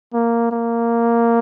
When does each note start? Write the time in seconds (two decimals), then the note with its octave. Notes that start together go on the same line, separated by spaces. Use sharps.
0.14 A#3
0.52 A#3